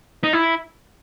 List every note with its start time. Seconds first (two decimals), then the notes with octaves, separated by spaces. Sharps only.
0.24 D#4
0.33 E4